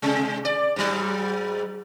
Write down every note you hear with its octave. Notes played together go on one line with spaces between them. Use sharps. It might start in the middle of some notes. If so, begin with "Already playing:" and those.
C3 G#3
D5
G#2 F#3